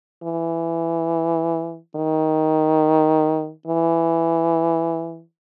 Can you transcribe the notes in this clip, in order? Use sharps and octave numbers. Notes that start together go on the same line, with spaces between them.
E3
D#3
E3